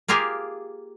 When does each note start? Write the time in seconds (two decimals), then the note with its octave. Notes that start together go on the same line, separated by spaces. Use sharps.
0.08 A#3 F4 G4 G#4 A#4